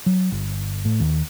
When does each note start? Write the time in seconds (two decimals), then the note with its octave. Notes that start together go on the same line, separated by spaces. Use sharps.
0.06 F#3
0.32 G1
0.85 A2
1.00 D#2